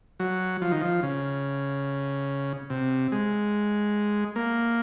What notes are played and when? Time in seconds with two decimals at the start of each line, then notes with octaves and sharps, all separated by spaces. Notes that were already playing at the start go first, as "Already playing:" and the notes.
0.20 F#3
0.62 F3
0.71 D#3
0.82 F3
1.03 C#3
2.70 C3
3.12 G#3
4.36 A#3